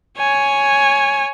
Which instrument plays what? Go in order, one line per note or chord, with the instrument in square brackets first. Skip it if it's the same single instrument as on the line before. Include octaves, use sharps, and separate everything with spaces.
[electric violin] C#5 G#5